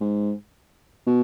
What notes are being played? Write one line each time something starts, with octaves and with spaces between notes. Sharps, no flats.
G#2
B2